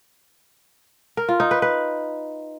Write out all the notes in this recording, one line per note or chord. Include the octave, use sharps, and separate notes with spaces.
A#4
F4
D#4
B4
B4